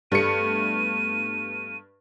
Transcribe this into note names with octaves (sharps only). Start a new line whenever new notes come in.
G2 G3 A3 B3 C#7 D#7